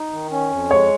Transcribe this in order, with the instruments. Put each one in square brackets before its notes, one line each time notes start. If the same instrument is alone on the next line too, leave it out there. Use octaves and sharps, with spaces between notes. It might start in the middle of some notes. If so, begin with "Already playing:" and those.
Already playing: [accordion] D#4
D#3
C#4
F2
[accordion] G#3 [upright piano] C#5